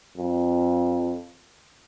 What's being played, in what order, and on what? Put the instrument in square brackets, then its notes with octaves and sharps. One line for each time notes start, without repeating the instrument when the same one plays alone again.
[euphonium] F2